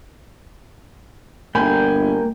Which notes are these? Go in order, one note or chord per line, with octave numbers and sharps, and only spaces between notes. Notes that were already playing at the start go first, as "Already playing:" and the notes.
G1 A#3 G5 G#5 B5